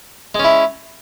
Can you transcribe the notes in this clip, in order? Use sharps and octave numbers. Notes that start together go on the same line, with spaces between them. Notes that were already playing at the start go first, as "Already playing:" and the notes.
G#3 C#4 E4